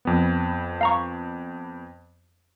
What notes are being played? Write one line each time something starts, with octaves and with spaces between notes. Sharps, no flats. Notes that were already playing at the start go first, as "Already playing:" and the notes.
F2 B3
F5 A#5 C#6